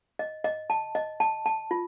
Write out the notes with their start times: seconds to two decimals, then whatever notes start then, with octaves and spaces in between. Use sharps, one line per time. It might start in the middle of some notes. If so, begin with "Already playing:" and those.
0.19 D#5
0.44 D#5
0.70 A5
0.95 D#5
1.20 A5
1.46 A5
1.71 F4